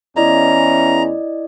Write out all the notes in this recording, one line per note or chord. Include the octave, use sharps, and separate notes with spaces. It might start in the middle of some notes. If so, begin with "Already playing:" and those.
E2 C#4 E4 D5 D#5 A#5